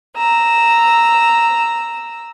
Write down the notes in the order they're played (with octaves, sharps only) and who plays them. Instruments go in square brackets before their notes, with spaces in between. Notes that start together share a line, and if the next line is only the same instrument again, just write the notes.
[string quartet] A#5 E6